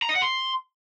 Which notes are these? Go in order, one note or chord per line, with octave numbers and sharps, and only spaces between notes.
A#5
D#5
F#5
C6